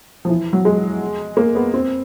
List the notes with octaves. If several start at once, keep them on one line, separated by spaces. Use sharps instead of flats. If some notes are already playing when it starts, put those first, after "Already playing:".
F3
E3
F#3
G#3
A#3
B3
C4